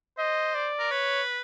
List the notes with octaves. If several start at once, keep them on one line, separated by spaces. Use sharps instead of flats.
C5 D#5
D5
A#4
B4 C#5